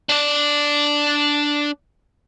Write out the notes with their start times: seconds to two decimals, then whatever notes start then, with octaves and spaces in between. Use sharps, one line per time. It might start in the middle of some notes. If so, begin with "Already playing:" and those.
0.09 D4 D5